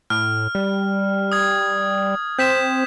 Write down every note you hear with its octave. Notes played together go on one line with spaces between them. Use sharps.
A2 F6
G3
D#6 G#6
C4 G6 B6 E7